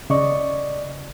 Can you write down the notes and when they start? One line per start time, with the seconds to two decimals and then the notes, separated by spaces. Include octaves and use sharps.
0.10 C#3 D5 D#5 C#6